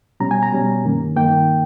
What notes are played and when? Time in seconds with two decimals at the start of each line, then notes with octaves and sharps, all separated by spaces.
0.20 B2 G3 C#4 A#5
0.31 G#5
0.43 A#5
0.53 B2 G3 C#4
0.85 G2 D#3 A#3
1.16 G2 D#3 A#3 G5